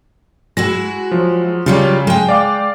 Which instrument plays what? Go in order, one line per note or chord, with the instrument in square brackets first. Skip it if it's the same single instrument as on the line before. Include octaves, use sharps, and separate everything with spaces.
[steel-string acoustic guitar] G#3 E4 F#4 [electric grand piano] A#6
[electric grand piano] F3 F#3
[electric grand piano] C#3 [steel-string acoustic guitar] F#3 G3 F4
[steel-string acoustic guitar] G#3 G5
[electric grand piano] D5 F5 D6